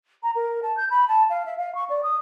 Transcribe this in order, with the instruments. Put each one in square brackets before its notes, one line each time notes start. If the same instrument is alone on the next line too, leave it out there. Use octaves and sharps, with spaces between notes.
[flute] A#5
A#4
A5
G6
B5
A5
F5
E5
F5
C#6
D5
D#6